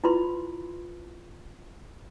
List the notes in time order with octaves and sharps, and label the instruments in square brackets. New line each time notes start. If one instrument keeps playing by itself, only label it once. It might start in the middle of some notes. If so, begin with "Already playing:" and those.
[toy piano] E4 F4 B4 B5 C6